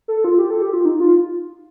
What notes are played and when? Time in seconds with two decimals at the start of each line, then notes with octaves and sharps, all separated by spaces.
0.08 A4
0.24 F4
0.39 G4
0.50 A4
0.62 G4
0.73 F4
0.85 D#4
1.00 F4